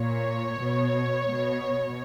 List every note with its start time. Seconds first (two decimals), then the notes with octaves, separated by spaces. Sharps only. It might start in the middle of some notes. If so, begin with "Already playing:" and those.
Already playing: A#2 C#5
0.62 B2
1.30 B2